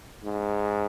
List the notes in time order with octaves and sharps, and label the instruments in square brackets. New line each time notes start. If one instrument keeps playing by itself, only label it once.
[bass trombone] G#2